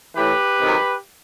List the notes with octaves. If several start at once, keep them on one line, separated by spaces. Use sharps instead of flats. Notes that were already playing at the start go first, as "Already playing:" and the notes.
A2 E3 G4 B4
C3 D#3 F#3